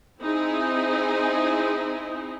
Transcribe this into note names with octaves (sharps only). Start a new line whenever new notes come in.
C4 D#4 E4 G#4